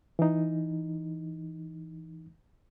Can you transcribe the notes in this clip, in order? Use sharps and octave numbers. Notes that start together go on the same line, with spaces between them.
E3 D#4